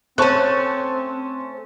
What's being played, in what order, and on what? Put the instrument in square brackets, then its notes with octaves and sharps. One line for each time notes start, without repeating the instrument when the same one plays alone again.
[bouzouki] A3 C#4 [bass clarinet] C4 [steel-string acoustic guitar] C5 [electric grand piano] A5 C#6 F#6